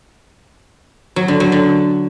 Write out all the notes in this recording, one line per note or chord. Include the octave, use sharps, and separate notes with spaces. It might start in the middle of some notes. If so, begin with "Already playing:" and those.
F#3
D3
F#3
D3